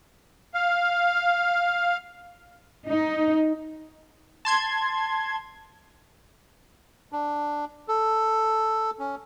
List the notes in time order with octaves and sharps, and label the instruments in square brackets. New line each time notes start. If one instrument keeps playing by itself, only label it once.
[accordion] F5
[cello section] D#4
[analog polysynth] A5 C6 G#6
[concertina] D4
A4
C#4